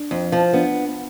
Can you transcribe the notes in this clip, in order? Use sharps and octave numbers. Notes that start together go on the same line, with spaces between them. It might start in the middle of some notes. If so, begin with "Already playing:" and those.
Already playing: D4
F2
F3
B3 D4